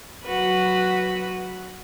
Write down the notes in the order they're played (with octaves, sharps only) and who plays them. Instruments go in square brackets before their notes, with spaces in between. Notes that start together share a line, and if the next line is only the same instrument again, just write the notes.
[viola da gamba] F#3 F#4 B4